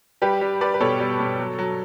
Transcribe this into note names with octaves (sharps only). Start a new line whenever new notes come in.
G3 G4 B4
G3
G3 B4 D5
B4
B2 A4 C#5
G3
B2
F#3
F#3